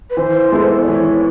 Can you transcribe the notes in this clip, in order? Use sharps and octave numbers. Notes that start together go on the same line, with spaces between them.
B4
E3 C5
G#3 B3 E4 A4
D5
E3 C#5